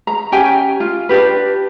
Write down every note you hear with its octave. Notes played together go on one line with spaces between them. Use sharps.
A#5
C#4 G4 G5 G#5
F4
D4 G4 B4